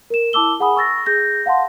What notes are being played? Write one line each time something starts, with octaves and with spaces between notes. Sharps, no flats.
A#4 E7
E4 A5 D6 E6 G7
G#4 F#5 G#5 B5 D#6
C#6 E6 A6 A#6
G#4 G6 A#6
F5 F#5 A5 C6